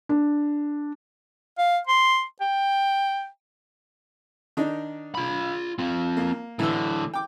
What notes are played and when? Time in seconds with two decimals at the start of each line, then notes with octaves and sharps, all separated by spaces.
0.09 D4
1.58 F5
1.87 C6
2.41 G5
4.57 D#3 D4 D#4
5.15 F4 B5
5.79 C4 F4
6.17 A#3
6.59 A2 D3 E3 E6
7.14 G5 D6